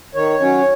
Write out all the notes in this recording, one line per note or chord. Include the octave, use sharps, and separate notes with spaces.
D#3 C#5
F#3 C#4